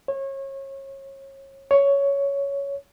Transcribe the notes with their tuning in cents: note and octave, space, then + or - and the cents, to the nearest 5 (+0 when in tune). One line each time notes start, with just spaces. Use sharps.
C#5 -30
C#5 +10